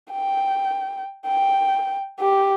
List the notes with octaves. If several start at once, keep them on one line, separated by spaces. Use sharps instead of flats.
G5
G5
G4